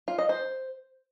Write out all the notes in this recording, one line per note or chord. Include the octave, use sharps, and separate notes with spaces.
F4
D#5
C5